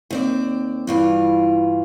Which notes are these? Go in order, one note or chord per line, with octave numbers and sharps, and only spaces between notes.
D#2 C4 D5
G2 E3 F4